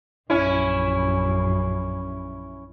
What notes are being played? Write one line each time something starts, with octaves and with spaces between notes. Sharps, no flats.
A#1 F#2 C#4 E4